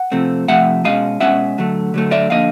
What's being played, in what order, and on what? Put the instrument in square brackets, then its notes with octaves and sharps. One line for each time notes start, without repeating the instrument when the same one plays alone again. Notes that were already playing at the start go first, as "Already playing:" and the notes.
Already playing: [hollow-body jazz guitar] F#5
C3 F3 A3 C4
C3 F3 A3 E5 F#5
B2 G#3 C#4 D#5 F5
B2 G#3 C#4 E5 F#5
D3 F#3 A3
D3 F#3 A3
D5 E5
D3 F3 A#3 D#5 F5